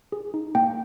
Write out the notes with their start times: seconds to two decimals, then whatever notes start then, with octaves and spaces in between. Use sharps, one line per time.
0.12 G#4
0.34 D#4
0.55 A#3 G5